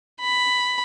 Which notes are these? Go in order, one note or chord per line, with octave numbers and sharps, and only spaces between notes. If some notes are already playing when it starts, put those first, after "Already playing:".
B5